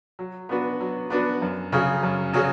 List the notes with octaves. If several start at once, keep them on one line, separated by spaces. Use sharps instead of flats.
F#3
B3 D4 F#4 B4
F#3
B3 D4 F#4 B4
F#2
C#3 F#3 C#4 G#4
F#2
C#3 F#3 C#4 G#4